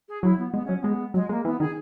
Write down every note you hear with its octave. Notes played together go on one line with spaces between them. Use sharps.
G#4
F#3 E4
B3
G#3 B3
F#3 C#4
C#4
G#3 B3
F#3 G#3
G#3 A#3
E3 B3
D#3 G#4